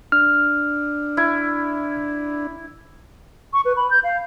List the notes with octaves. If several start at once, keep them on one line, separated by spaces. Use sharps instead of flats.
D4 F6
E4
C#6
B4
B5
G6
F5